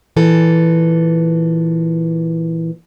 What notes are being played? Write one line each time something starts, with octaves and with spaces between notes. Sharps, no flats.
A#2 E3 A4